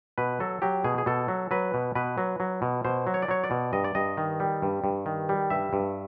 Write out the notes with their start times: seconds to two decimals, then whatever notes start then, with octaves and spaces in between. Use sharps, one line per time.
0.18 B2 B4
0.40 F#3 A4
0.62 F#3 G4
0.84 B2 G#4
0.98 G#4
1.06 B2 A4
1.28 F#3
1.51 F#3 B4
1.74 B2
1.95 B2 B4
2.18 F#3
2.40 F#3
2.62 B2
2.85 B2 C5
3.07 F#3
3.14 C#5
3.22 D5
3.28 F#3 C#5
3.44 D5
3.51 B2
3.73 G2 D#5
3.84 D5
3.95 G2 D#5
4.17 D#3
4.40 G3
4.62 G2
4.84 G2
5.06 D#3
5.29 G3
5.50 G2 E5
5.73 G2